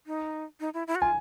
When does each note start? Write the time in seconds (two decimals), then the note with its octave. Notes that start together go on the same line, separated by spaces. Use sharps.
0.07 D#4
0.60 D#4
0.74 E4
0.87 E4
0.95 F#4
1.01 F4 G#5